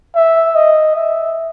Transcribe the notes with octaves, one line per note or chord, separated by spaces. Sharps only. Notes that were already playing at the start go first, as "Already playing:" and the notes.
E5
D#5
E5